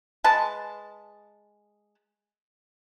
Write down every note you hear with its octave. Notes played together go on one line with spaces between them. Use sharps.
G#3 B4 A5